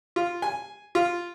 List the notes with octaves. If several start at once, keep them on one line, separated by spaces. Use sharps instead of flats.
F4
G#5
F4